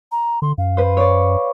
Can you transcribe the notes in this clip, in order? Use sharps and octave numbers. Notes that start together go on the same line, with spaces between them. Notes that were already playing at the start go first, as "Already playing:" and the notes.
A#5
D3 C6
F#2 F5
B4 C5
C#5 D5